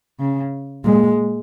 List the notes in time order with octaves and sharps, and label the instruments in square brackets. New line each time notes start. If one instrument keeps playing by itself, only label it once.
[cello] C#3
[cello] A#2 [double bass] G#3